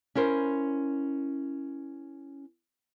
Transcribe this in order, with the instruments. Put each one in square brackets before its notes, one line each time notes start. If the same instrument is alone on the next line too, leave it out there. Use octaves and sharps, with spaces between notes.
[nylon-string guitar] C#4 E4 A#4 C5